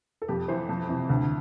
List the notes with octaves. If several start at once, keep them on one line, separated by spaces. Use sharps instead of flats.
A4
F2 G4
E3 C5 E5
F2
C3 E3
D2